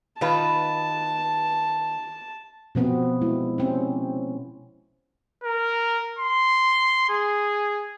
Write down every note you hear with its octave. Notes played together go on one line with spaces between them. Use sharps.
D#3 F4 B4 A5
B2 F3 B3 C4
G#3 E4
C4 C#4
A#4
C6
G#4